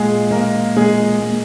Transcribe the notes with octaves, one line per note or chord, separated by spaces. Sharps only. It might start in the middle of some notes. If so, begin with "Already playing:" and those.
Already playing: A#2 G#3 G#4
G#3 A#3 A#4
A#2 G#3 G#4
G#3